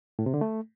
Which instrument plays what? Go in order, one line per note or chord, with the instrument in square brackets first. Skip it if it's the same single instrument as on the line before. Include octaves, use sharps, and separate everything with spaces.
[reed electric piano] A2
C3
D3
A3